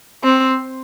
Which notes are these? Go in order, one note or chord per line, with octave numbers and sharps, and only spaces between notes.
C4